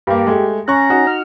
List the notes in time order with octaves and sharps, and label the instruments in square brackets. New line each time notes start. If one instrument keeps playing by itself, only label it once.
[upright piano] G2 A#3 [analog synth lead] G4
[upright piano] G#3 A3
[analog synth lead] C#4 [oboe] A#5 [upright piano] C#6 F#6
[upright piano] D#4 F#4
[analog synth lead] F6